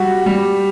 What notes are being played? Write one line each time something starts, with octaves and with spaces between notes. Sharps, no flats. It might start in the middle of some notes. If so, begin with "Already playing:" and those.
Already playing: G3 F#4
G3